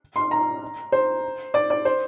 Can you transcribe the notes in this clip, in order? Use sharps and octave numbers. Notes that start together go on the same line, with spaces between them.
C6
A#5
C5
D5
D5
C5